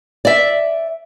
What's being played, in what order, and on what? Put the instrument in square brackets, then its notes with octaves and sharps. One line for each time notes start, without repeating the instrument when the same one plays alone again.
[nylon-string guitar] D5 E5